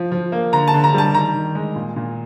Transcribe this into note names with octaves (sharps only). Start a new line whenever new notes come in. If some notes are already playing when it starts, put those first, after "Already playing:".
Already playing: F3
F3
A#3
D3 A#5
A5
D3
A#5
G3 A5
D#3 A#5
D#3
G#3
A#2
A#2